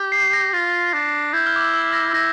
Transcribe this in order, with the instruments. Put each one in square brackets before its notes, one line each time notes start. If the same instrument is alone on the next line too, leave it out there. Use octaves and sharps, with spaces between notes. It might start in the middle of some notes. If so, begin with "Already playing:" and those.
Already playing: [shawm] G4
[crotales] C7
A#6
[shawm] F4
D4
[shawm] E4 [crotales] G6
[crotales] F6
D6
E6
E6
A#6
[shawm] E4 [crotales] A#6